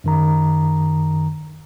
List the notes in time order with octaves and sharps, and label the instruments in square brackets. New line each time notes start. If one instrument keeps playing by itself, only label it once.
[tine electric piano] F#2 D#3 A#5